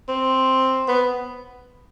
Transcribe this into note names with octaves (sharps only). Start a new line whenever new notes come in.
C4
B3